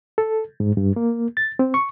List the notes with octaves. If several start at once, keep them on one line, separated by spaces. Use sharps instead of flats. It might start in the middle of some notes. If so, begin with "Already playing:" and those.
A4
G#2
G2
A#3
A6
C4
C#6